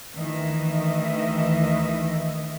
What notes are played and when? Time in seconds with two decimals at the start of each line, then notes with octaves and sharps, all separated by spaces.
0.15 D2 D#3 E3 D#5 E5